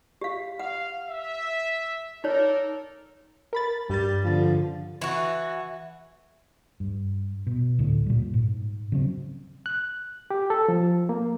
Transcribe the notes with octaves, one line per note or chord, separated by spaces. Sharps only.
G4 F5
F5 F#5
E5
D#4 A4 A#4 C#5 D5
A#4 B5 A6
G2 G3 A6
D3 F3
E3 F#4
G2
B2
D2 A2 D3
A#2 G3
G#2
C#3 F#3 C4
F#6
G4
A4
F3
A#3